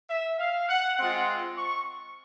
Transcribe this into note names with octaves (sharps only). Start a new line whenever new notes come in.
E5
F5
F#5
G#3 C4 F4 F#5
C#6